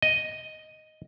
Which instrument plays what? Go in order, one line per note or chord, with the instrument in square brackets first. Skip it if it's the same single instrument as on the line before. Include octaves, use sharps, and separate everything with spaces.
[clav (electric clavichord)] D#5